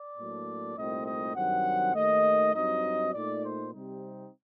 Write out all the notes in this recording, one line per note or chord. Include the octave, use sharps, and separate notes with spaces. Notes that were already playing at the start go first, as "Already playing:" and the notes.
Already playing: D5
A2 F#3 A#3 D4
C2 A#2 A3 C4 D#4 D#5
D#5
G2 D#3 F#3 C4 F#5
D#2 D#3 A3 D#5
G2 F#3 C4 D#4 D#5
A#2 A3 D#4 D5
C5
C3 G3 C4 D#4